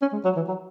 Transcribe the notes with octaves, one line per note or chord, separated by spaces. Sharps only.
C#4
G#3
F#3
E3
F#3